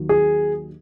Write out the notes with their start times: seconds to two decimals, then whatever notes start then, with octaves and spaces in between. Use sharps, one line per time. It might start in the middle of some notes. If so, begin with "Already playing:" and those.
Already playing: D#2 D#3 F#3
0.09 G#4